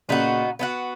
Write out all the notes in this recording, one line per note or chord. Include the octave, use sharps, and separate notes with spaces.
A#2 C#3 B3 D#4 F#4
B3 D#4 F#4